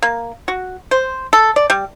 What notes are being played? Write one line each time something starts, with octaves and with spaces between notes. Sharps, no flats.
A#3
F#4
C5
A4
D5
G3